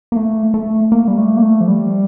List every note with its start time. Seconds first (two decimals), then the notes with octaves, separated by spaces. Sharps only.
0.12 A#3
0.16 A3
0.54 A3
0.92 A#3
1.08 G3
1.18 A3
1.37 A#3
1.42 A3
1.61 F3
1.68 G3